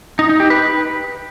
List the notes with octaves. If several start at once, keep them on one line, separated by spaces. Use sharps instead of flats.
D#4
D#4
G4
B4